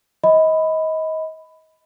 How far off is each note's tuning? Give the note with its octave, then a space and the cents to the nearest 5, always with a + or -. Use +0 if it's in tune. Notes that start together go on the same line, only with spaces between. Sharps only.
D#5 +30 B5 +10